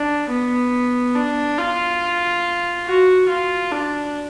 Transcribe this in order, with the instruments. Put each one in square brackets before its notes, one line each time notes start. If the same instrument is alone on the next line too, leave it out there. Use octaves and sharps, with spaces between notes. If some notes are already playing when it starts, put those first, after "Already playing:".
Already playing: [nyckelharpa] D4
B3
D4
F4
F#4
F4
D4